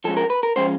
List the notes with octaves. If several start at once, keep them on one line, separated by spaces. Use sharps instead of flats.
F3 G#3 C#4 A4
A#4
B4
A#4
F3 G#3 C#4 C5